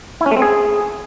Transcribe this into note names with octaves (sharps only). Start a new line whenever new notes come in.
E4
C#4
A3
C4
G#4